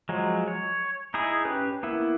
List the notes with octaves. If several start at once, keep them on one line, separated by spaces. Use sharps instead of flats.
F3 F#3 G#3
C#5
D#4 E4 G#4 D#6
C#4 G4 B4
A#3 B3 E4